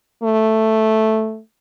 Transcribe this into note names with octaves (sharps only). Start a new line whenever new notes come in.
A3